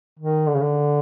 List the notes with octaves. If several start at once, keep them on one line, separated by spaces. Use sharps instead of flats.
D#3
D3
C#3
D3